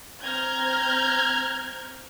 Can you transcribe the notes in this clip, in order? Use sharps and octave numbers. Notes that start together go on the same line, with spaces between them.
C4 A#5 F6 G6 G#6